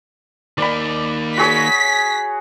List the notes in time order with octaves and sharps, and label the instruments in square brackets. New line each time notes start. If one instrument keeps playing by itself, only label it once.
[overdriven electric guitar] D#3 A#3 [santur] D5 B5
[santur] F#4 G#4 C#5 [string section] B6